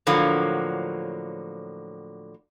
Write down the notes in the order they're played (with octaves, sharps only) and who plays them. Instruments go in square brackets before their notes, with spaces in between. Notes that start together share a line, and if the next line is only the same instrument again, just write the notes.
[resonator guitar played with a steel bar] A2 D3 F3 F#3 A#3